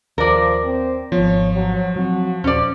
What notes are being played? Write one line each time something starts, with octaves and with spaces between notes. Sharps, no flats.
D#2 F3 A#4 D5
C4
G#1 F3 B3 C#5
F#3
F#3 C4 F#4
D#1 C#4 C5 D5